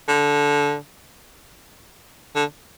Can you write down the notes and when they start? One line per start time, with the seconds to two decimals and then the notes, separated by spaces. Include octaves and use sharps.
0.08 D3
2.35 D3